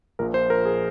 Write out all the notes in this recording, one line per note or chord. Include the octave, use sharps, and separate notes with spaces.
A#1 A#2 F3 A#4
C5
A#4
G#4